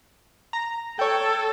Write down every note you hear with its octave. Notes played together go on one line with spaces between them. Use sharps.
A#5
A4 C#5 G5